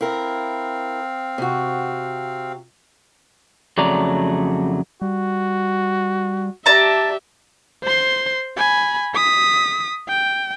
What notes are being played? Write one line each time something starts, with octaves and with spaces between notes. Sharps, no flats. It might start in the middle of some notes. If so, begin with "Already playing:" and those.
C4 E4 A#4 F5
C3 F#4
F2 C#3 F#3 A3 D5 A#5
G3 F#4
G4 D5 E5 A5 A#5
C5 C6
G#5 B5
D#6 B6
G5